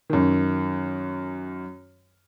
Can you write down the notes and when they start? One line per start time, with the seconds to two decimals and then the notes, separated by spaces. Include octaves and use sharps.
0.10 F#2 D#3